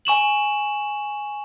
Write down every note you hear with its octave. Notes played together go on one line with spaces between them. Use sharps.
G#5 C#6 E7 F#7